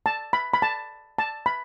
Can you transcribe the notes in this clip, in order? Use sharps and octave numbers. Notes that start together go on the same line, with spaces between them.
A5
B5
B5
A5
A5
B5